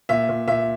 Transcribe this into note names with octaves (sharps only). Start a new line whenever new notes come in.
A#2 E5
A#2
A#2 E5